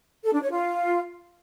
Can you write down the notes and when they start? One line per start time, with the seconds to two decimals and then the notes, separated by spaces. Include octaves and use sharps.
0.24 A4
0.33 D4
0.42 C#5
0.51 F4